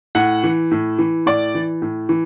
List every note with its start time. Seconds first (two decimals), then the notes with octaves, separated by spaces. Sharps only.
0.15 A2 F#5
0.44 E3
0.71 A2
0.99 E3
1.26 A2 D5
1.55 E3
1.82 A2
2.09 E3